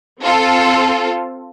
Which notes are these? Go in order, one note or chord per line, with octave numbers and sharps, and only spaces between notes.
C4 F4 A4